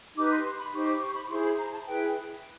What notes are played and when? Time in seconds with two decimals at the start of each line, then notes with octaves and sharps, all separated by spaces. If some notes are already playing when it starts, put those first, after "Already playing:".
0.16 D#4 G4 B4 D6
0.31 C6
0.44 C6
0.59 B5
0.72 D#4 G4 C5 C#6
0.87 D6
1.02 C#6
1.15 B5
1.29 E4 G#4 C5 C6
1.44 B5
1.58 A#5
1.72 A5
1.86 E4 G#4 B4 G5